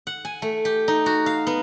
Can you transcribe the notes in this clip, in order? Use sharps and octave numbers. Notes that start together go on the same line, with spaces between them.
F#5
G#5
A3
G4
D#4
F#4
F5
B3